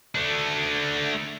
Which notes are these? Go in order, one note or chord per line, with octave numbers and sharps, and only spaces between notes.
A3 D4